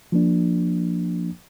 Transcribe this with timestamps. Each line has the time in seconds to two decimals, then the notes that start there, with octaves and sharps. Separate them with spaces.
0.12 F3 A#3 D4